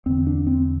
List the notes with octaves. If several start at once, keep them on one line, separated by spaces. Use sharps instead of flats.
E2 D3 C4
D4
C4